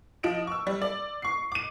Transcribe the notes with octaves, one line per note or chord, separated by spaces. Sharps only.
F3 D#5 D7 E7
C#6 E6
G3
D5
C#6 C7
D6 D#7